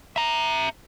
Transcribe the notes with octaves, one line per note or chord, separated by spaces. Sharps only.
E5 A#5